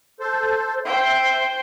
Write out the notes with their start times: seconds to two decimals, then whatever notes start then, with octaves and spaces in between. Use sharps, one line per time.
0.20 A4 C5
0.85 C5 E5 G5